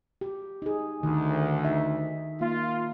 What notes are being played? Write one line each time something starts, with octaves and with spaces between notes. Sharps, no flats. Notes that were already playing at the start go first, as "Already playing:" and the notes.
G4
D#4 G#4
D2 D#3 D#4
D#4 E5
A#3 F4